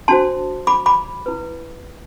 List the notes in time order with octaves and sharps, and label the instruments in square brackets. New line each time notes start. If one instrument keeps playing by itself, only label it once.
[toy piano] D4 F#4 C5 A5 C6
B5 D6
B5 D6
E4 B4